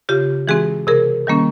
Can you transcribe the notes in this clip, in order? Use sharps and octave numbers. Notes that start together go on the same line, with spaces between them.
C#3 F4 G4
E3 G#3 C4 F#4 G#4
C3 G#4 A#4
D#3 G3 A#3 C#4